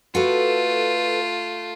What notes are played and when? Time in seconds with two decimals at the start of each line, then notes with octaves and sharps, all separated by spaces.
0.15 A3 F4 F#4 A4 B4